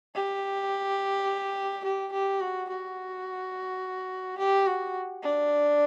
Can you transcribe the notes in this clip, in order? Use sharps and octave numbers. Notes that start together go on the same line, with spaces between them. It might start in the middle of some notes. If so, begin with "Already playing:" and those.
G4
G4
G4
F#4
F#4
G4
F#4
D4